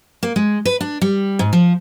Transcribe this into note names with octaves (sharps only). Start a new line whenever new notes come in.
A#3
G#3
B4
D4
G3
G#2
F3